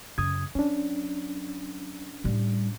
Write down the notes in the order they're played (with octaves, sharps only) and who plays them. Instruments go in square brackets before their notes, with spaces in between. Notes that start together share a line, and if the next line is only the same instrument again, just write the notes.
[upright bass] F#2 [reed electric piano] C#3 D#6 G#6
[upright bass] F#3 [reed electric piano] C#4 D4
[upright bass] A2 G3